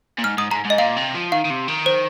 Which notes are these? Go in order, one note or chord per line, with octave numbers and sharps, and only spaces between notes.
A#2
G#2 F6
G#2 D#6
G#2 A#5
G#2
D#5
A#2 F5
C3
F3
D#3 F5
D#3
C3
D#3
C5